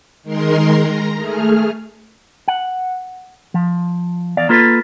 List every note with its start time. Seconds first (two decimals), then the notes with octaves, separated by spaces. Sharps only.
0.23 D#3 G#3 A#4 C6
0.78 A#5
1.16 A3 G#4 F6
2.48 F#5
3.54 F3
4.37 E2 D5 F5
4.49 A#3 F4 A4 B4